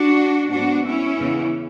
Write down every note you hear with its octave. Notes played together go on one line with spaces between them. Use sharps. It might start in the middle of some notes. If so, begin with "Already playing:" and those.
Already playing: D4 F#4
G#2 F#3 B3 D4 F#4
C#4 E4
E2 C#3 E3 B3